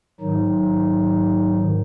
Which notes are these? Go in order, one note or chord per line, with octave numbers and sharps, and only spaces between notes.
G#2 D#3 F#3 D#4